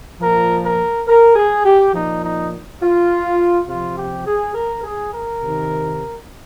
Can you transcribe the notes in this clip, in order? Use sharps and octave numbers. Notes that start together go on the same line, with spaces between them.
A#2 F3 A#4
A#4
A#4
G#4
G4
A#2 F3 D#4
D#4
F4
C3 F3 F4
G4
G#4
A#4
G#4
A#4
C3 D#3